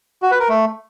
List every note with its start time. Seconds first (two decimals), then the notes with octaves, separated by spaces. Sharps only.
0.22 F#4
0.31 B4
0.40 A#4
0.49 A3